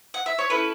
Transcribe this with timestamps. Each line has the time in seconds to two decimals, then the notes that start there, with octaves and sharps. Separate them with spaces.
0.14 F#5
0.26 E5
0.39 C#5
0.49 C#4 E4 A4 B4